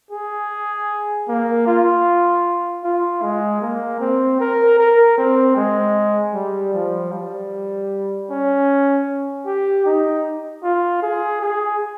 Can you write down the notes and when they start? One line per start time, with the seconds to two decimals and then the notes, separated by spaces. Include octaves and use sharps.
0.11 G#4
1.28 A#3
1.67 F4
2.84 F4
3.22 G#3
3.61 A#3
4.00 C4
4.40 A#4
4.78 A#4
5.18 C4
5.57 G#3
6.34 G3
6.74 F3
7.12 G3
8.30 C#4
9.46 G4
9.86 D#4
10.63 F4
11.02 G#4
11.41 G#4